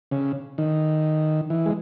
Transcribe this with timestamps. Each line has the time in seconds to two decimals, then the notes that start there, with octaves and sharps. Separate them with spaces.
0.11 C#3
0.58 D#3
1.50 E3
1.66 G#3